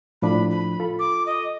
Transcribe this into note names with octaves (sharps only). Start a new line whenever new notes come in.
A2 F3 D4 B5
B5
F4 A4
D6
D#5